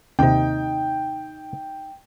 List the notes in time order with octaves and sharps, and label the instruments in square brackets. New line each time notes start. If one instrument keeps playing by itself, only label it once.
[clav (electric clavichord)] D#2 C3 [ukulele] D4 D#4 [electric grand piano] G5